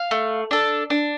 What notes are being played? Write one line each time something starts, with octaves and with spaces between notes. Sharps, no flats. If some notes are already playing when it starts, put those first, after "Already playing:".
Already playing: F5
A3
D4 A4
D4